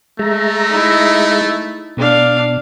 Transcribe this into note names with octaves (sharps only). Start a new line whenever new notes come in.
G#3 A3 E5 A#5
D#4 E4
B2 D4 F5